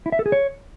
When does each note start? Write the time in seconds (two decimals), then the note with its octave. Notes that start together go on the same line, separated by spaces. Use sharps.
0.06 E4
0.12 E5
0.19 A4
0.26 G#4
0.32 C#5